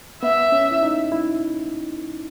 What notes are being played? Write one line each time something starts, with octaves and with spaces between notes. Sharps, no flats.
B3 E5
C#4
E4
D#4
E4